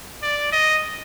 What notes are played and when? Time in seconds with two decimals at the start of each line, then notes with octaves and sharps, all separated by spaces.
0.22 D5
0.52 D#5